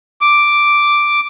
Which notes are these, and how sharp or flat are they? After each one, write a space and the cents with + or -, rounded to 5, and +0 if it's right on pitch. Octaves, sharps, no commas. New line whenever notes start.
D6 +0